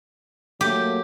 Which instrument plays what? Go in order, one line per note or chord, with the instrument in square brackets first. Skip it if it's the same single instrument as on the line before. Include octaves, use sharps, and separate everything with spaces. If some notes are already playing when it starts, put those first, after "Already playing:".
[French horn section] F#3 A3 A#3 [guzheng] G4